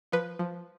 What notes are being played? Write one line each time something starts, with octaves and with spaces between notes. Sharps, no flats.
F3 B4
F3